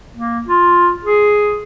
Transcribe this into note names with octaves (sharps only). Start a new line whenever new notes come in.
A#3
F4
G#4